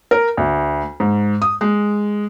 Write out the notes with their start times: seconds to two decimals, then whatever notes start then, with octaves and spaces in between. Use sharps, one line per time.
0.11 A#4
0.37 D2
1.00 G#2
1.42 D#6
1.61 G#3